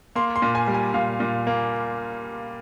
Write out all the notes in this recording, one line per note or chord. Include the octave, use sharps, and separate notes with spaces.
A#3 C6
C6
A#2
G#5
G3
G#5
A#2 F5
A#2
A#3